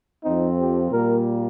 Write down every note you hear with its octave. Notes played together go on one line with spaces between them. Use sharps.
F2 F3 C4 D#4
G4
A#2 G3 A#3 A#4